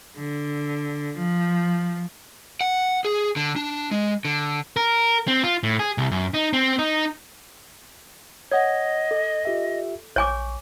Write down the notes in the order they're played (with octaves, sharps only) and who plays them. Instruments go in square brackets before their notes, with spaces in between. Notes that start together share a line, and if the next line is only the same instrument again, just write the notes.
[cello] D3
F3
[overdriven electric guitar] F#5
G#4
D3
D4
G#3
D3
[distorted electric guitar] A#4
C4
F4
A2
G#4
C2
F#2
D#4
C4
D#4
[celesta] C#5 F#5 [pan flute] D#5 [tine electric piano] D#6 G#6
[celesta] A4
[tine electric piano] F4 G4 E5
[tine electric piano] A#1 C#6 [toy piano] C#5 G#5 D6